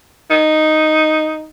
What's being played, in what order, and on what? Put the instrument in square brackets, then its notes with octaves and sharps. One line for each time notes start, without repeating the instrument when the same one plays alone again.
[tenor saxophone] D#4